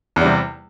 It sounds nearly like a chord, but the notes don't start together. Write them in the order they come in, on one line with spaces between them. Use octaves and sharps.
E2 G3 C3